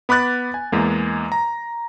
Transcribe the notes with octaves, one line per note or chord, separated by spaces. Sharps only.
B3 B5 D6 F#6 A6
G#5
E2 G#3 A#3
A#5